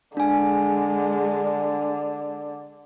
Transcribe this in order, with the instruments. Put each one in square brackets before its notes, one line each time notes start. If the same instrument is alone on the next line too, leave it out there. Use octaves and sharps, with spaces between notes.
[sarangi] D3 [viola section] G#3 [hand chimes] D4 G#5